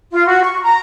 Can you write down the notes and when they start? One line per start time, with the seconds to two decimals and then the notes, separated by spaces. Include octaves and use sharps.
0.11 F4
0.28 F#4
0.44 C#6
0.63 A#5